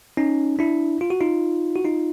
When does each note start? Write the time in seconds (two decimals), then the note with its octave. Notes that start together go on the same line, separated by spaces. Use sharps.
0.17 C#4 D#4
0.59 D4 E4
1.01 F4
1.10 F#4
1.20 D#4 F4
1.76 F#4
1.85 D#4 F4